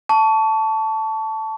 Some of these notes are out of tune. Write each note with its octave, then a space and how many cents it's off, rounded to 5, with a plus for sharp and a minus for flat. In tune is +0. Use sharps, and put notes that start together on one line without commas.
A5 +0 C#6 +30